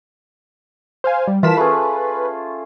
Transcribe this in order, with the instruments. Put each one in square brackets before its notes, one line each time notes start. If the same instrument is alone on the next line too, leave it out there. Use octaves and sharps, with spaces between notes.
[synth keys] C5 F5 G#5
G3
[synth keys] E3 B6 E7 [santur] F4 A#4 A5
[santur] A3 C#4 G#4 [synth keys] B4